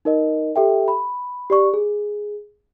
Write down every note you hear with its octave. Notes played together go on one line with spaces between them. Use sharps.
D#4 A#4 D#5
G4 A4 E5 G5
B5
G4 D5 C#6
G#4